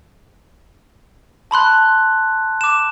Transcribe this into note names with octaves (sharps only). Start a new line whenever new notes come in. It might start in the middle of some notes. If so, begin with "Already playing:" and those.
A5 B5 C6 F#6
D6 E7